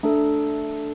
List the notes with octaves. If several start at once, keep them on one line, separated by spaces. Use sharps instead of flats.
A3 D4 A4